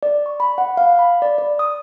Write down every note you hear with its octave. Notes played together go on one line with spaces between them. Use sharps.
D5
C#6
B5
F#5
F5
B5
D5
D5
D#6